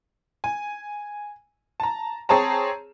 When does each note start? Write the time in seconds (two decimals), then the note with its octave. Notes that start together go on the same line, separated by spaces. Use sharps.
0.44 G#5
1.80 A5 A#5
2.29 C4 G#4 C#5 A5 A#5